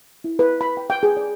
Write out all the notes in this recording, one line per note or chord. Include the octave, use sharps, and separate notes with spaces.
E4
B4
B5
G5
G5
G#4
D5